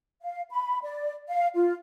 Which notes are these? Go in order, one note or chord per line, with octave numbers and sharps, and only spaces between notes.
F5
B5
D5
F5
F4